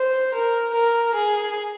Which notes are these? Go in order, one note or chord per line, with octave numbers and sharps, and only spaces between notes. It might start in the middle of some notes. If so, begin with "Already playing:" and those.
Already playing: C5
A#4
A#4
G#4